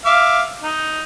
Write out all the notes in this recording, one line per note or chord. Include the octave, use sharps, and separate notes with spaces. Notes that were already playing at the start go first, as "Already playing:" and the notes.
E5 F5 D6
D#4